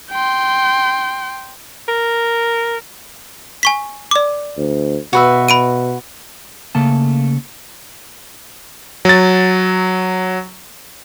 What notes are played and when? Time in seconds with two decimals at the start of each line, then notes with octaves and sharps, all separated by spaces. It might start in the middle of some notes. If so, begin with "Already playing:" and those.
0.11 G5 C6
1.88 A#4
3.63 G#5 C#6 B6
4.11 D5 D6
4.57 D2
5.13 B2 F#4 B4 E5
5.48 B5 D7 D#7
6.75 C#3 A3 A#3 A5
9.05 F#3 A6